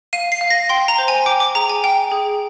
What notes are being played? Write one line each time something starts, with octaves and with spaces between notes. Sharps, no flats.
F5 D#7
C7
F5
A#6
G5 C6
A#5
C5
G#5
G5 D6
D6
G#4 A#5
G#5
G5
G#4